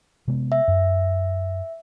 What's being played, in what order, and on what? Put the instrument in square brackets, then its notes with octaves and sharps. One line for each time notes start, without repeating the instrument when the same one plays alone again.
[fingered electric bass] C3 G#3 B3
[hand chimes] E5
[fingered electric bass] F#2